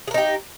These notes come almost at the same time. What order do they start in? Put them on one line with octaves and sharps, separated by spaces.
G#4 A#4 D#4 G4